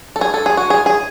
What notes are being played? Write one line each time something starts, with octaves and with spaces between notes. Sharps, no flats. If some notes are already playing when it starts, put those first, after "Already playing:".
A4
G#4
A4
G#4
F#4
G#4
G#4